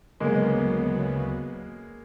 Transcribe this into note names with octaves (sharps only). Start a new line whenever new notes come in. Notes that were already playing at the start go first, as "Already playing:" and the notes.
D2 C#3 F#3 G#3 A#3 B3